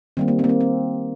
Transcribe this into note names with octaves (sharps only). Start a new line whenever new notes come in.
D#3 G3 A#3 C4
A#3
C4
A#3
C4
C4